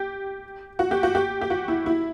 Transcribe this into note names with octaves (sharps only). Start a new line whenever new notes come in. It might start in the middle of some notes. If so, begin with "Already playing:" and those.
Already playing: G4
F#4
G4
F#4
G4
G4
F#4
E4
E4